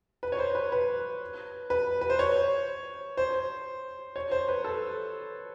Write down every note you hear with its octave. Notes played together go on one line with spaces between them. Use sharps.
B4
C#5
C5
B4
B4
B4
B4
C5
C#5
C5
C#5
C5
B4
A4